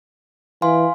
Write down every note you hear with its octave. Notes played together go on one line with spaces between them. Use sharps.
E3 F5 G#5 C6